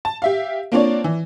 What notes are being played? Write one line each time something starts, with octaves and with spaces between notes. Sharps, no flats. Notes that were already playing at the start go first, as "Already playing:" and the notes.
A5
G4 E5 F5
A#3 C4 D4 F4 C#5 D5
E3